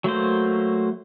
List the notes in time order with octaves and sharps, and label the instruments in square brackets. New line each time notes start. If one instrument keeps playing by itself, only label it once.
[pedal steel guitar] F#3 A3 A#3 C5